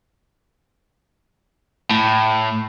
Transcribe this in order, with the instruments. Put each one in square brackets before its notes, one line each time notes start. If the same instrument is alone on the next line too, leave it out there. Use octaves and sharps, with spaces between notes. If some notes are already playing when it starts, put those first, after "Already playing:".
[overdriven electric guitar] A2